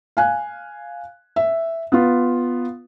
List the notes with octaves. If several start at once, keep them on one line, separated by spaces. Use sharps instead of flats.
F5 G#5 F#6
E5
B3 F4